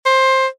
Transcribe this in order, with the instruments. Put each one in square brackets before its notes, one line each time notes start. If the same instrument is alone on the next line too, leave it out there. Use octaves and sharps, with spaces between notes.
[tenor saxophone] C5